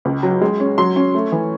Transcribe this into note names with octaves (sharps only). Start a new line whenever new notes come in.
C#2
F#3
G#3
C#4
F#3 C6
C#4
A3
E3